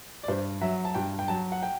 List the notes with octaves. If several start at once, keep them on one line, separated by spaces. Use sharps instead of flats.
D5
G2 C5
F#3 E5
A5
G2 G5
G5
F#3 A5
F#5
G5